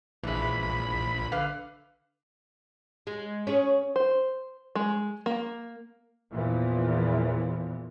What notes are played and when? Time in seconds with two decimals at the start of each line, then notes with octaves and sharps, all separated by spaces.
0.24 A#1 E3 G#3 B5
1.32 D3 B4 F5
3.07 G#3
3.47 C#4 G#4
3.96 C5
4.75 G#3
5.26 A#3
6.32 E2 A#2 E3 F3